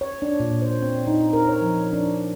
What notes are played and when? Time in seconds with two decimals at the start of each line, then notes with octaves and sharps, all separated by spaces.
0.01 C#5
0.22 D4
0.40 A#2
0.62 C5
0.83 C4
1.07 D#4
1.33 A#4
1.49 C#5
1.62 F3
1.93 D4